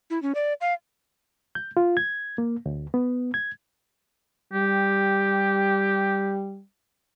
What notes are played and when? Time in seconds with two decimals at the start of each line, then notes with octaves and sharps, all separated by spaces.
0.10 E4
0.22 C#4
0.35 D5
0.61 F5
1.55 G6
1.77 F4
1.97 G#6
2.38 A#3
2.66 D2
2.94 B3
3.34 G#6
4.53 G3 G4